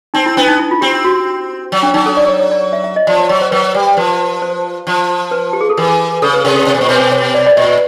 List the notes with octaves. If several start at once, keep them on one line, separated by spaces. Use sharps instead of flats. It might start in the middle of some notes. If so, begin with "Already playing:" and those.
C4 D#4
E4
B3 D4
D#4
E4
F4
C4 G4
F#4
F#3
D4
F#3 D#4
A4
D5
C#5
C#5
D5
E5
E5
D#5
F3 D5
C#5
F#3 C#5
C5
F#3 B4
G3
F3 B4
C5
F3
B4
G4
G#4
A4
E3 A#4
C#3 A4
B4
C3 A#4
A4
C3 C#5
B2
A#2 C5
B2 B4
C5
C#5
D5
D5
A#2 D#5